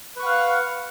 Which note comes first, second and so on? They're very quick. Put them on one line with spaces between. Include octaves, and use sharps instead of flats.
B4 C#6 F#5 F5